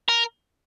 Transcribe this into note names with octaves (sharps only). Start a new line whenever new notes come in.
A#4